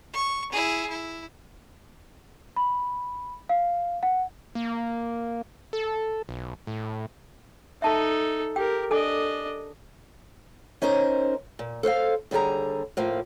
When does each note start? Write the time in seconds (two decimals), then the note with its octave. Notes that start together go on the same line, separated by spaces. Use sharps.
0.13 C#6
0.52 E4 G#4
0.89 E4
2.56 B5
3.49 F5
4.03 F#5
4.55 A#3
5.73 A4
6.29 B1
6.67 A2
7.82 D#4 A4 E5 A5
8.56 G4 A#4 G5
8.91 D4 A4 D#5 G#5 D6
10.82 C#4 D#4 A#4 C5
11.59 A#2
11.83 A4 C5 C#5 F5
12.31 D#2 D3 G3 G#4 A#5
12.97 A2 F3 A#3